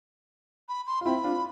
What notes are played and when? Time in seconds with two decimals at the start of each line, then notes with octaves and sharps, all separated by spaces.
0.69 B5
0.87 C6
1.01 F4
1.05 C4 E4 B5
1.24 D4 F4